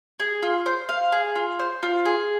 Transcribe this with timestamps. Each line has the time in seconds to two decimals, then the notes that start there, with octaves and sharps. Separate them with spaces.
0.20 G#4
0.43 F4
0.66 C5
0.89 F5
1.12 G#4
1.36 F4
1.59 C5
1.83 F4
2.05 G#4